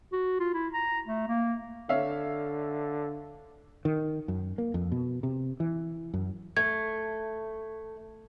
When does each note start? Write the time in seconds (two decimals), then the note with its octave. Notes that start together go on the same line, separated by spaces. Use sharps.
0.12 F#4
0.40 F4
0.54 E4
0.73 A#5
1.07 A3
1.28 A#3
1.89 D3 C#5 E5 F5
3.85 D#3
4.28 F#2
4.58 A#3
4.74 F2
4.92 B2
5.23 C3
5.60 E3
6.14 F#2
6.57 A3 G#6